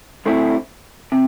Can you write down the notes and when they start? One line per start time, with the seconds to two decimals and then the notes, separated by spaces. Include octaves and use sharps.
0.26 D2 D3 A3 C4 E4
1.12 C3